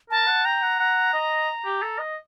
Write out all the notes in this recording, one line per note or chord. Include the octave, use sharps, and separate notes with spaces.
A#4 A5
F#5
G5 A#5
F#5
F#5
D#5
G4
A4
D#5